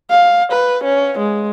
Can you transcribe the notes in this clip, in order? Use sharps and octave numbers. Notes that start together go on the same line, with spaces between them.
F5
B4
C#4
G#3